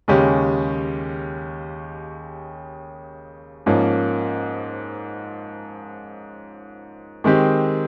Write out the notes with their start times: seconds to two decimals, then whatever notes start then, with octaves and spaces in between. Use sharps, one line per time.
0.08 D#2 C#3 G#3 C#4 G4
3.66 G#2 F3 A#3 C#4
7.24 D#3 G#3 C4 G4